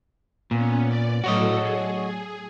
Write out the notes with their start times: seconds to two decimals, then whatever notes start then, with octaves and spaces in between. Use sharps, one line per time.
0.51 A#2 B3 C#4
0.87 D5
1.24 A2 F#3 F#4 A4 C#5 D#5
1.59 G#4